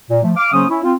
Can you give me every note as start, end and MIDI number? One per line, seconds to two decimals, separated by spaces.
0.10 0.20 46
0.24 0.32 53
0.24 0.32 57
0.36 0.51 77
0.36 0.51 86
0.53 0.65 49
0.53 0.65 54
0.53 0.65 58
0.53 0.65 61
0.53 0.65 72
0.53 0.65 87
0.70 0.79 61
0.70 0.79 64
0.84 0.94 60
0.84 0.94 65